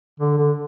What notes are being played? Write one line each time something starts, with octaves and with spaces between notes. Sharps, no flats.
D3
D3